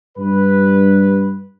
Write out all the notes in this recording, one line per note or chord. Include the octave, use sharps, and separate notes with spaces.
G2 B4